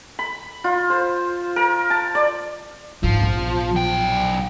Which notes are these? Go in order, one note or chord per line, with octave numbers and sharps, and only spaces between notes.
B5
F4
C5
A#4
A5
D5
G#2 F3
A#1 B3
B1 G5